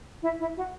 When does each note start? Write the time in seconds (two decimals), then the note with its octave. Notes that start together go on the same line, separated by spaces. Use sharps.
0.22 E4
0.39 E4
0.57 F#4